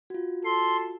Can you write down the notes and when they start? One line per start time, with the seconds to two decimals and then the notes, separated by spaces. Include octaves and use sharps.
0.10 F4 F#4
0.45 A4 C6